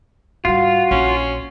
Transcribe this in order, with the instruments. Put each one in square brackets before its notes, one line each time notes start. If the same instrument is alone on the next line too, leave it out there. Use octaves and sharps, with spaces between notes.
[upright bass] G#2 G3 [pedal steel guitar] F4 [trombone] F#4
[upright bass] A#1 [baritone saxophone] C#4